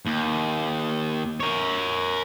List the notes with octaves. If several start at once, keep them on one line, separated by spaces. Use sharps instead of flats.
D#2
A#4 C#5